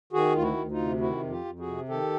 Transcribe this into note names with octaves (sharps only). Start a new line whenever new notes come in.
D#3 F#4 G#4
D2 F4
E4 F#4
D2
D#4 F4
C3
D#3 E4 F#4
F2
F4 G4
F2
F#4 G#4
C3
D#3 G4 A4